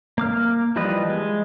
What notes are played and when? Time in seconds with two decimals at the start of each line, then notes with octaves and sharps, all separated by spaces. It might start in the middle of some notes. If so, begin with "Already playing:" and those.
0.18 A#3 D6 F6
0.76 E3 F3 G3 B4 D#5
1.10 G#3